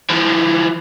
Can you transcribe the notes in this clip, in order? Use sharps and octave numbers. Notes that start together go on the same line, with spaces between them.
E3 F3